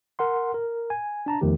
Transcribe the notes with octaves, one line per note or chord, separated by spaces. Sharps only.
A#4 F#5 C6
A#4
G#5
D4 A5 A#5
E2 D#3 F3 A3 G4